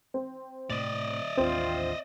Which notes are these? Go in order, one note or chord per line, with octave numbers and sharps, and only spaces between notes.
C4
A2 C3 D5 D#5
A1 D#2 C4 D4 F4